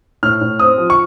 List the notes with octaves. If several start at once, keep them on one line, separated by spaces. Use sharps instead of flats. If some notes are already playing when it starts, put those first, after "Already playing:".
A2 F6
A2
C4 D#6
F3
C#6